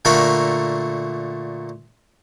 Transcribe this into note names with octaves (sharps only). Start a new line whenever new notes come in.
A#2 D3 A3 F#4 A#4 B5